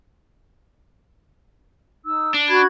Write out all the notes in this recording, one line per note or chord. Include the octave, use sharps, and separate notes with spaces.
D#4 E6
D4
F#4 B5 G#6